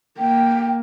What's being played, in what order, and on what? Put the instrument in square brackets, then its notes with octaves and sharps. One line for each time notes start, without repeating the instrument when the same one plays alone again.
[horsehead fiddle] A#3 [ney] G5